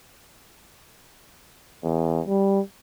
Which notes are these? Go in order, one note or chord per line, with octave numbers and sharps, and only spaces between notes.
E2
G3